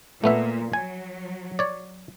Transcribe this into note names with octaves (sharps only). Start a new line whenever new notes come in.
A#2 A3 B3 E5
F#3 G#5
C#5 D5